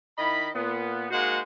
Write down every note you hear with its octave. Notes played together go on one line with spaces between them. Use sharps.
D#3 E4 D#5 B5
A#2 B3
G#3 A#3 D#4 F#4 C5 F#5